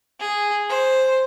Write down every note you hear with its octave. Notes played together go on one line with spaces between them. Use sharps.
G#4
C5